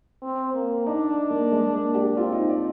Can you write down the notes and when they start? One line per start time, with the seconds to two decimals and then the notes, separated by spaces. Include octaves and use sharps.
0.22 C4
0.54 A#3
0.86 D4 D#4
1.30 A#3
1.52 G#3
1.73 A#3
1.95 G4
2.17 C4 F4
2.32 D#4
2.50 D5